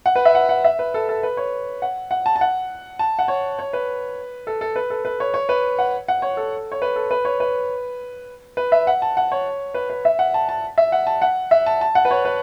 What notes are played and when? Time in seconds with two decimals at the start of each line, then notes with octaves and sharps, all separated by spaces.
0.06 F#5
0.16 B4
0.25 E5
0.35 F#5
0.49 F#5
0.64 E5
0.79 B4
0.94 A4
1.09 A4
1.23 B4
1.37 C#5
1.82 F#5
2.11 F#5
2.26 A5
2.36 A5
2.41 F#5
2.99 A5
3.19 F#5
3.28 C#5
3.59 C#5
3.73 B4
4.47 A4
4.61 A4
4.76 B4
4.90 A4
5.05 B4
5.20 C#5
5.34 C#5
5.49 B4
5.79 F#5
6.08 F#5
6.22 C#5
6.37 A4
6.72 C#5
6.82 B4
6.96 A4
7.11 B4
7.25 C#5
7.40 B4
8.57 B4
8.72 E5
8.87 F#5
9.02 A5
9.17 F#5
9.32 C#5
9.74 B4
9.90 B4
10.05 E5
10.19 F#5
10.34 A5
10.49 A5
10.78 E5
10.92 F#5
11.07 A5
11.22 F#5
11.51 E5
11.66 A5
11.81 A5
11.95 F#5
12.05 B4
12.11 C#5
12.25 B4